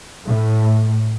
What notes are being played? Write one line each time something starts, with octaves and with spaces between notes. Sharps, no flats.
A2